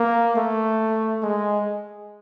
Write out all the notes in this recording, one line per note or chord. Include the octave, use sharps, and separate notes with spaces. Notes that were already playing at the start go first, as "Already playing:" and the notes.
Already playing: A#3
A3
G#3